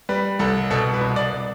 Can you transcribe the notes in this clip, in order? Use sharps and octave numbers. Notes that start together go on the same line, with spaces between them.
G3 B4
C2 A4
B2 A4
B4
C2
D5